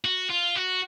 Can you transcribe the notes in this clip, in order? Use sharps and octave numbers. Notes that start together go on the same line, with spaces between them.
F#4
F4
F#4